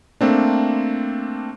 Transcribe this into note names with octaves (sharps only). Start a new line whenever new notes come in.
A3 A#3 C4 D4